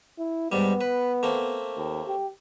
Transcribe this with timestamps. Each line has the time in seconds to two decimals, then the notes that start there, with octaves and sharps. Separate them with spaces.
0.19 E4
0.52 G#2 G3 B3
0.81 B4
1.23 A3 A#3 C4
1.77 D#2
2.08 G4